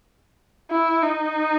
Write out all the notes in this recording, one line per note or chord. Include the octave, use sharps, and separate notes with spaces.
E4
D#4